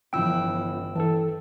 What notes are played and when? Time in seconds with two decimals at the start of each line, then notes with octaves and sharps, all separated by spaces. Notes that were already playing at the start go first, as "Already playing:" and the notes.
0.13 G1 C#3 E3 F3 G5 E6
0.95 E3 A4 A5